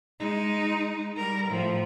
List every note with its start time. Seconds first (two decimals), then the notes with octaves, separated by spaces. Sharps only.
0.20 G#3 D#4
1.17 G3 A#4
1.50 A2 F3